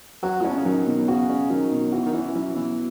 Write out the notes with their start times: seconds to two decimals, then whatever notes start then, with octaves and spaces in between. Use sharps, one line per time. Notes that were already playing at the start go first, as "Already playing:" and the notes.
0.23 F#3 F#4
0.42 A2 C#4
0.50 B2
0.57 C#3
0.65 D#3 F#3
0.86 B2
1.08 C#3 F#4
1.29 C#4
1.50 D#3 F#3
1.72 B2
1.92 E3 F#4
2.06 D#3
2.13 E3 C#4
2.35 E3 F#3
2.55 B2 E3